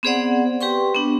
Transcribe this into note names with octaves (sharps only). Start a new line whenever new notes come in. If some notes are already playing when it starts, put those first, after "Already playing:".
B3 C4 G#4 C5 D5 F#5
G4 B4 G5 C6 C#6
B3 D4